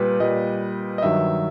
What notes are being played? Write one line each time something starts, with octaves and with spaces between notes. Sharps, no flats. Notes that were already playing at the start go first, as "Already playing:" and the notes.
Already playing: A#2 G3 B4
A#2 G3 D#5
D#5
G2 D#3 F#3 E5